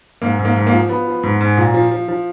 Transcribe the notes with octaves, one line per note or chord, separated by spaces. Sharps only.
G#2 A#3
G#2
A#3
G#2
A#3
F3
F3 B3
F3
G#2
G#2
A#2
F3
F3
F3